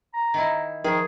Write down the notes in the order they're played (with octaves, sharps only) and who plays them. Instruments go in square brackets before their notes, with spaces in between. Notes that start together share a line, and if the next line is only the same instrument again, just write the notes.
[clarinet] A#5
[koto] D#3 E4
[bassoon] D#3 [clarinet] F3 [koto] G#4